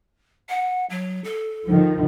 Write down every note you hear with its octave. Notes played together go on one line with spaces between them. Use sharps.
F#5
F#3
A4
D#3 F3